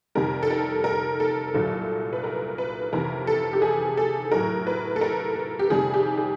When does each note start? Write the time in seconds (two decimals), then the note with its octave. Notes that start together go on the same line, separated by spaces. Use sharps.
0.15 F2 C3 D#3 G3 A#4
0.43 A4
0.50 A#4
0.84 A#4
1.20 A4
1.54 C2 A#2 F#3 A4
2.13 B4
2.24 A#4
2.58 B4
2.93 F2 C3 E3 A#4
3.27 A4
3.53 G4
3.62 G#4
3.97 A4
4.32 A2 F#3 A#4
4.67 B4
4.96 A4
5.01 A#4
5.35 A4
5.59 G4
5.70 F2 C3 D#3 G3 G#4
5.94 G4
6.18 G#4